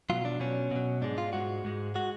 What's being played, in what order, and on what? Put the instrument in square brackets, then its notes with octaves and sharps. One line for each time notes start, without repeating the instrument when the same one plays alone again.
[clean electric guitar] B2 F#3 F4
D4
B2 F#3 C#4
B2 F#3
G#2 G#3 D4
F4
G#2 G#3 F#4
G#2 G#3
G#3 F#4